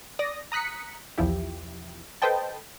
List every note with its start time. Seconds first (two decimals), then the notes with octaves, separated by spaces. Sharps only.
0.19 D5 D#6 A#6
0.52 A#5 D#6 F#6 B6 C#7
1.18 B1 E2 F3 E4 G4
2.22 A4 B4 C5 D#5 G5 A5